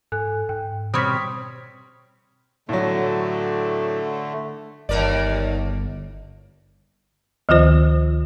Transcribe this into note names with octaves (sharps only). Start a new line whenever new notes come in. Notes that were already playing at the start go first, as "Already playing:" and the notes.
G#2 A4 G#5 F#6
G#2 G5
B2 G3 C4 C#5 D#6 F6 B6
A2 D3 F#3 A3
G1 D#2 A#4 D5
D2 D#3 F3 F4 C5